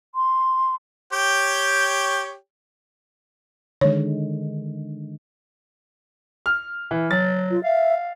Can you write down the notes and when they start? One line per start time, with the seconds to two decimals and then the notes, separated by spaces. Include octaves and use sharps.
0.15 C6
1.12 G4 C#5 G5
3.81 D3 D#3 G#3 C#5
6.46 F6
6.91 E3
7.11 F#3 A6
7.51 F4
7.64 E5 F5